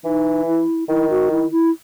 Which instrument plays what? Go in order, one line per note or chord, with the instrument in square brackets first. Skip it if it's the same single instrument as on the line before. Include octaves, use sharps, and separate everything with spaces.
[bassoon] E3 [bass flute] D#4
[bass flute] E4
[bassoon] D#3 [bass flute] E4
[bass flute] F#4
E4
E4